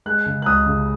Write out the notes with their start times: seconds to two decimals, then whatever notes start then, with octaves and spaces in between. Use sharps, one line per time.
0.06 G#3 F#6
0.26 C#3
0.42 F#6
0.46 C#2 D#6
0.66 C#3